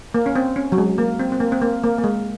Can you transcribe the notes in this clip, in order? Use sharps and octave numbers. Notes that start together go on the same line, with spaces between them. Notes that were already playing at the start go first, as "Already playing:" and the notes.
A#3
C#4
C4
C#4
F#3
G#3
A#3
C4
C4
A#3
C4
A#3
A#3
A#3
G#3